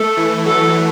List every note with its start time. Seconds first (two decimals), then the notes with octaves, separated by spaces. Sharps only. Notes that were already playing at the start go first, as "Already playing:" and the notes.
Already playing: A3 A4
0.17 E3
0.46 F#3 A4